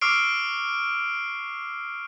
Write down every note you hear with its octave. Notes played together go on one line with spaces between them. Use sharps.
C#6 D6 E6 F6 C7 D7